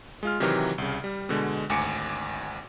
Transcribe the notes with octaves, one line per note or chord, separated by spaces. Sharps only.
G#3 F4 F6
C3 D#3 E3 F#3 G4 F6
C2 C#3
G3
B2 D3 G#3
G#1 D2 G#5 D6 C#7